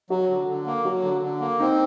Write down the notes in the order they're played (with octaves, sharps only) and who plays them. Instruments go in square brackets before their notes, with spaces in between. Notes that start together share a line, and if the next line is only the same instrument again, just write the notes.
[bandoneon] F#3 [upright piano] F#4
[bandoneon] D3
D3
A#3
[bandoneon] F#3 [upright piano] F#4
[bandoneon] D3
D3
A#3
[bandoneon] C4 [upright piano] D#4